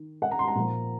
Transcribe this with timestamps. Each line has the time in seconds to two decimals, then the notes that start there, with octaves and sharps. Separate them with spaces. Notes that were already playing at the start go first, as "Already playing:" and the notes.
Already playing: D#3
0.22 F#5
0.31 A#5
0.39 C6
0.48 A#5
0.55 A#2 F3 A#3